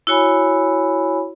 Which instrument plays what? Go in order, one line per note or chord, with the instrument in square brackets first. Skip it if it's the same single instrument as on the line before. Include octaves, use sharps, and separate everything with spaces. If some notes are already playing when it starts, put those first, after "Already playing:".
[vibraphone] E4 F#4 C#5 G#5 B5